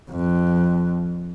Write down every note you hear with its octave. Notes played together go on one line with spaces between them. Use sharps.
F2